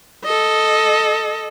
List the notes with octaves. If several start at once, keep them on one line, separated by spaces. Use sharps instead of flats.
A4 D#5